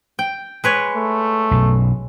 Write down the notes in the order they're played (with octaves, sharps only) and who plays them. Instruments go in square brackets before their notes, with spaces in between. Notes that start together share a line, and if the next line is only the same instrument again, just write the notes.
[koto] G5
G#3 B4 C#5
[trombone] A3
[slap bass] B1 F#2 B2